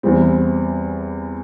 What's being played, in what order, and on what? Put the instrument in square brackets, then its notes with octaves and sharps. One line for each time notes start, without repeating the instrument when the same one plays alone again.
[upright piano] E2 E3 G3 C4